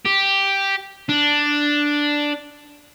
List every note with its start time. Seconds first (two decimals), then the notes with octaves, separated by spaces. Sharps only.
0.05 G4
1.09 D4